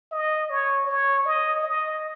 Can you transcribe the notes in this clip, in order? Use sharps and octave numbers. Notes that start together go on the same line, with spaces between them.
D#5
C#5
C#5
D#5
D#5